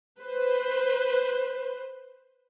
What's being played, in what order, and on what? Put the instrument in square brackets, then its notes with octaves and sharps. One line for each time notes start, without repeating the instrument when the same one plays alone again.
[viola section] B4 C5